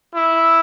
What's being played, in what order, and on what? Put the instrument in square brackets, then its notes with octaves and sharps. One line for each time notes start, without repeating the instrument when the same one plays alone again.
[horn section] E4